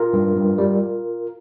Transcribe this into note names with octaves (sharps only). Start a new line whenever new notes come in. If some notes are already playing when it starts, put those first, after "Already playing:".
Already playing: F4 A#4
G2
G2
G3